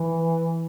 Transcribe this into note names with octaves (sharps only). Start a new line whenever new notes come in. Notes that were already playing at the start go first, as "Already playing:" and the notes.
Already playing: E3